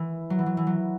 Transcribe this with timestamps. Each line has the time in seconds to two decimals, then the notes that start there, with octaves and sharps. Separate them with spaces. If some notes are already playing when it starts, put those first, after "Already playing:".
Already playing: E3
0.30 F#3
0.39 E3
0.46 F#3
0.57 E3
0.67 F#3